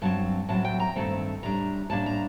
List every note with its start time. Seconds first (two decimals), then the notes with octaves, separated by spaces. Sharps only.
0.02 G2 F#3 C4 A5
0.49 A2 F#3 C4 A5
0.65 G5
0.80 A#5
0.96 G2 D#3 A3 C4 A5
1.43 A2 G3 D4 A#5
1.90 A2 G3 A#3 D4 A5
2.06 A#5